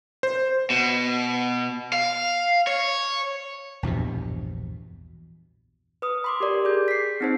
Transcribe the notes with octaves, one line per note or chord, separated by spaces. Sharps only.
C5
B2
F5
C#5
A#1 E2 G2 B2
B4 D#6
B5 C6 D6
G4 A#4 D5
G#4 G6
B6 C7
C4 D#4 C5